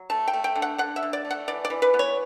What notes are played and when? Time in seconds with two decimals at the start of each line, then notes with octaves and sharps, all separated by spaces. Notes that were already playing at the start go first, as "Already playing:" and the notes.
Already playing: F#3
0.10 A3 A5
0.27 G5
0.33 A3
0.44 G5
0.55 D3
0.62 F#5
0.78 D3 F#5
0.96 E5
1.03 D3
1.13 D5
1.25 A3
1.31 F#5
1.48 E3 D5
1.65 D5
1.70 E3
1.82 B4
1.94 B3
1.99 C#5